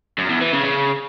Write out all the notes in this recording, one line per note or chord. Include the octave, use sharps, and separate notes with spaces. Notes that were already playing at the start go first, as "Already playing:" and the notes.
F#2
E2
E3
C#3
C#3